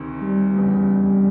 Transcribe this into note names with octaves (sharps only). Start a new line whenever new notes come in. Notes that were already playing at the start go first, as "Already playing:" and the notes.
Already playing: D2 C3 D#3
G3
F1 E2 C#3